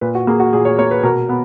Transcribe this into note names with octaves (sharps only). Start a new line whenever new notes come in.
A#2 B4
F#4
A#3 G#4
F#4
A#2 G#4
C#5
A#3 C#5
B4
B2 A#4
B3